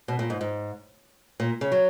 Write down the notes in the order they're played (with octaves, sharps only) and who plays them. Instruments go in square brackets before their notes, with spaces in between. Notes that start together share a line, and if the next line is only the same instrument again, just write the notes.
[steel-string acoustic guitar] B2
A#2
G#2
G#2
A#2
C#3
F#3